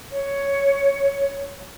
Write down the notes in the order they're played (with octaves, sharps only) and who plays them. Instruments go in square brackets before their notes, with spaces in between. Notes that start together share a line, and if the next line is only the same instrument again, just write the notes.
[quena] C#5